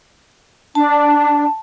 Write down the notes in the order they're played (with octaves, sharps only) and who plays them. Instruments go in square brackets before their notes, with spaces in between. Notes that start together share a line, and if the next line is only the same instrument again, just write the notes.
[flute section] D4 [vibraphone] A5